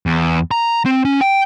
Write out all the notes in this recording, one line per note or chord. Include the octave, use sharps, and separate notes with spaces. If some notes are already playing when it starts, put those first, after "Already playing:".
E2
A#5
C4
C#4
G5